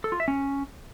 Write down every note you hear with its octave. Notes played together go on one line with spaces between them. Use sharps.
A4
F4
E5
C#4